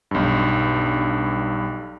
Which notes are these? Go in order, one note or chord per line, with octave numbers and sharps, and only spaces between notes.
B1 G2